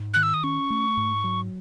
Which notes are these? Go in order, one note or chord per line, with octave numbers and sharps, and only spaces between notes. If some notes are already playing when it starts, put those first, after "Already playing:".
Already playing: G#2
D#3 F#6
E6
D#6
C#4 C#6
A3
G#2
F#3